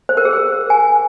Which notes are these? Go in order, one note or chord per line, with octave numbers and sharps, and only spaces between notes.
C5
A#4
G#4
A#4
G#5